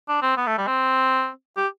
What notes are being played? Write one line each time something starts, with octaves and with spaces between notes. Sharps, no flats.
D4
C4
B3
A3
G3
C4
G4